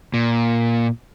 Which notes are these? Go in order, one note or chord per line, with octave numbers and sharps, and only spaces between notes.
A#2